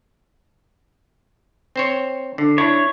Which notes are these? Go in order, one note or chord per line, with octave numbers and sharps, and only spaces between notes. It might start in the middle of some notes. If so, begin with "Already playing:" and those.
C4 C5 C#5
D3
D4 E4 C#5